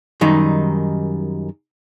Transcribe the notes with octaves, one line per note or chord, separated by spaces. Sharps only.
F#2 D#3 G3 D#4